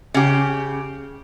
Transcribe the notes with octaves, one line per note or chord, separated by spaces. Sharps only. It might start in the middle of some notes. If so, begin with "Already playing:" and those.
C#3 G4